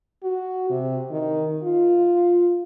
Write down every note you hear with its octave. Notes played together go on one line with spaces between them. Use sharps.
F#4
C3
D#3
F4